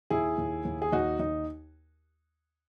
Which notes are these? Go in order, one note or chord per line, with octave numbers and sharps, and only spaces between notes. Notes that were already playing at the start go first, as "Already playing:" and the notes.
D#2 E4 G#4
D#2
D#2
G#4
D#2 D#4 F#4
D#2 D#4